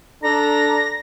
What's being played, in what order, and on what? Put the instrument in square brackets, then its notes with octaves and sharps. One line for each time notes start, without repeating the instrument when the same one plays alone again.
[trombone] D4 [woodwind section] A4 A#5 [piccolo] A#6